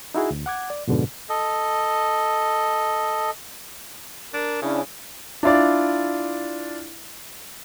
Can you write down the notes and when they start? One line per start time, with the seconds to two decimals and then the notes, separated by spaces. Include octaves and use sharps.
0.15 D#4 E4 F#4 G#4
0.31 D2
0.46 F#5 D6 G#6
0.70 D5
0.87 F2 G#2 B2 D3
1.29 A4 D#5
4.34 D4 A#4
4.62 C#3 C#4 D4 E4
5.43 D4 E4 F4 D5